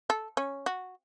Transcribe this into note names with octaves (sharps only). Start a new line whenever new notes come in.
A4
C#4
F#4